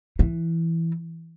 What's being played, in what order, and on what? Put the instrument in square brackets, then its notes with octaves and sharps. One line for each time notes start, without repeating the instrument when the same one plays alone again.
[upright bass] E3